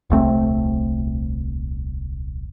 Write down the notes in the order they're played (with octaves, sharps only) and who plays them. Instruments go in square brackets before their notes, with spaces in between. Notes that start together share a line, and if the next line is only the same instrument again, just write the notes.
[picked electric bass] D#1 C2 A3 C4